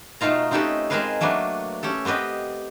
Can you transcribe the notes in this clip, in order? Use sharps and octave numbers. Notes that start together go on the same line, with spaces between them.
B2 A3 D#4 F4 A#5
C4 C#4 D#4 G4 A4 B4
G#3 C4 G#4 A#4 B4 F5
F#3 A3 A#3 D4 B4
C#4 G4 A4
B3 C4 G4 B4 D#5